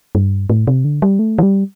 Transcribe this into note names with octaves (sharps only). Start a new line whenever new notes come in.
G2
A2
C3
D3
G3
A3
E3
G3